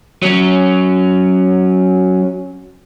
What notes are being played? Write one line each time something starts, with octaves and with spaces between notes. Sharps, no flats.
F#3 C#4